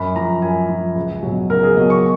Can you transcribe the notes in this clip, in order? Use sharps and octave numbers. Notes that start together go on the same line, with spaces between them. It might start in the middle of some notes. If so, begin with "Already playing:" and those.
Already playing: F#2 B5
F3 A#5
F#2 G#5
F3
C#2
B2 F#3
C#2 A#4
G#4
B2 F#3 D#5
C#6